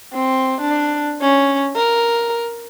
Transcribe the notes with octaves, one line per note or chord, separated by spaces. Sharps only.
C4
D4
C#4
A#4